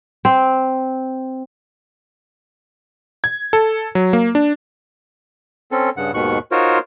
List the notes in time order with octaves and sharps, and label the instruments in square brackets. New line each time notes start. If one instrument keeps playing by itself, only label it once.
[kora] C4
[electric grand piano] G#6
A4
F#3
A#3
D4
[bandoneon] C4 C#4 A4
G2 C#3 F#5
D#2 G#2 B2 D#3 C#6 F#6
D#4 F4 F#4 A#4 C5 C#5